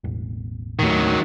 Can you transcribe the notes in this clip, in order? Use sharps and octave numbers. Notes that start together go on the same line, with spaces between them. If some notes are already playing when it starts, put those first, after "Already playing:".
E1 A1
A1 D#2 D#3 F#3 A3